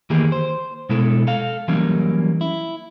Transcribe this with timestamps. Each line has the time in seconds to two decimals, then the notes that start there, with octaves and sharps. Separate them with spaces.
0.10 D#3 E3 A#3 G4 G#4
0.32 C5
0.89 B2 G#3 E4 A4
1.27 A4 F5
1.68 E3 F#3 G3 A#3 C#4
2.41 E4